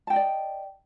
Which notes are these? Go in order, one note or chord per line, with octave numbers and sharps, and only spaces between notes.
D5 D#5 G5 A5